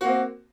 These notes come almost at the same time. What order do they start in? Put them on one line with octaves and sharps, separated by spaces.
F#4 A#3 C4